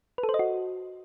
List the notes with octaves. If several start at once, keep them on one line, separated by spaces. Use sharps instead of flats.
B4
A4
C5
D#5
F#4